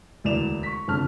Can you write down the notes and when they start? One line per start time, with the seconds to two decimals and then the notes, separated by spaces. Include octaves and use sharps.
0.24 E1 D2 E3 D5 E7 F7
0.63 C#6 B6
0.88 F#1 F2 D3 A5 F6